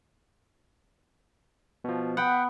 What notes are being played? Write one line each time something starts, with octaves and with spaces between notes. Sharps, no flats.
B2 F3
B3 F#5 G5